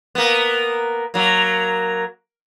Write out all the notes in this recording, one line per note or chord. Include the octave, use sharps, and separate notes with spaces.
A#3 B3
F#3 A#3